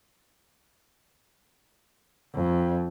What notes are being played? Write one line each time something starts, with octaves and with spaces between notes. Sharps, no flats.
F2